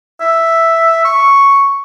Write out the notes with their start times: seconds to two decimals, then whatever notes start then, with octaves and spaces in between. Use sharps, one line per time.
0.21 E5
1.05 C#6